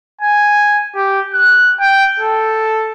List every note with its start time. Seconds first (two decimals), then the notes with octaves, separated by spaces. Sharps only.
0.22 G#5
0.95 G4
1.34 F#6
1.80 G5
2.20 A4